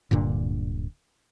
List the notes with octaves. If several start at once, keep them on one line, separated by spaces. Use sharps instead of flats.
D1 G2 A#2 D3